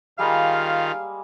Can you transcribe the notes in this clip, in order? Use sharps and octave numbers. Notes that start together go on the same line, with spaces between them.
D#3 G3 G#3 A#3 F4 F5